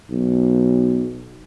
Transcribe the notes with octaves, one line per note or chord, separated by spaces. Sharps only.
B1